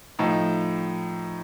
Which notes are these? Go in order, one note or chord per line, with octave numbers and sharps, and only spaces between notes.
A2 F3 D#4